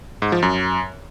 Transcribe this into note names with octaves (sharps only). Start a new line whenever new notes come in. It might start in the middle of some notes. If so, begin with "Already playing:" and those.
G#2
F3
F#2